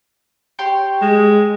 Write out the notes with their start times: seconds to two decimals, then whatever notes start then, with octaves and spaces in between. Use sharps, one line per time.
0.59 G4 C#5 C6
1.02 G#3